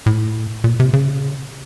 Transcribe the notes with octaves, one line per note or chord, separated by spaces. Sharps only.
A2
A#2
C3
C#3